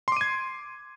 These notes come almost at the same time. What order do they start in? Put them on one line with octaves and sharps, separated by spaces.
C6 D6 D#7 G#6